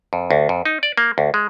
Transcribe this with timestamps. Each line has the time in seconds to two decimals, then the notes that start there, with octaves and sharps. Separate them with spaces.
0.13 F2
0.31 D2
0.49 F2
0.65 D#4
0.83 D5
0.98 A#3
1.18 D2
1.34 G#3